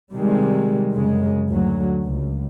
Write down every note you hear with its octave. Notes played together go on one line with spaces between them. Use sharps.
C3 D#3 G3 G#3
F#2 C#3 G#3
D2 F#3
C#2